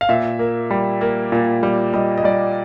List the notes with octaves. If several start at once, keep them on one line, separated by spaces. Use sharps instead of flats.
F5
A#2 E5
A#3
G3
A#3
A#2
G3
G3 D#5
D#5
G3 D5